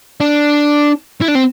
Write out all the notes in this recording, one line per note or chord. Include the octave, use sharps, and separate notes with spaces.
D4
E4
D4
C4